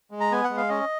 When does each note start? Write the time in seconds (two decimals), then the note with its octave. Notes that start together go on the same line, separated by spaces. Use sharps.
0.11 G#3
0.20 A#5
0.31 B3 G#5
0.44 F#5
0.50 G#3
0.57 F5
0.69 C#4 D#5